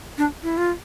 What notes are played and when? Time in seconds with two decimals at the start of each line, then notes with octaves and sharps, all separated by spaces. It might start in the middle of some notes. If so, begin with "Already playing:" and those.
0.18 D4
0.43 E4
0.58 F4